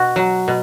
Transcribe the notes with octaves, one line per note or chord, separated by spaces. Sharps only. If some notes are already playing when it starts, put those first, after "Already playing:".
Already playing: B2 F#4
F#3
B2